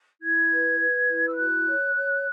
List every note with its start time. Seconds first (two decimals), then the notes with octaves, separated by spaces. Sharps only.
0.20 E4 G#6
0.50 B4
0.78 B4
1.08 E4
1.28 E6
1.36 F#4 F#6
1.66 C#5
1.95 C#5